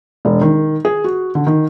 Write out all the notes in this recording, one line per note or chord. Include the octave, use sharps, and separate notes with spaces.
E1
D#3
G#4
F#4
D3
D#3